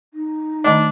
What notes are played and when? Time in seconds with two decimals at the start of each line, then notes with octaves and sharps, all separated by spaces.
0.14 D#4
0.64 D#3 A3 D4 D#5